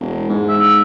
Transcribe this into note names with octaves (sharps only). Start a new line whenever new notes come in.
E1
G#2
E5